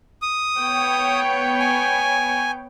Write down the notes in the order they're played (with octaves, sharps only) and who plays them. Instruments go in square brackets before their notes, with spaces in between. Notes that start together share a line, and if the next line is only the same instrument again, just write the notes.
[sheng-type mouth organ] D#6
[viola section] B3 C#5 G5
[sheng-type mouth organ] G#5